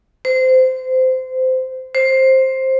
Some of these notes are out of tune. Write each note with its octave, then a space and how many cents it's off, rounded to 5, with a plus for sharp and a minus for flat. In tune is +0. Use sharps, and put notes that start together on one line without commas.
C5 -20
C5 +10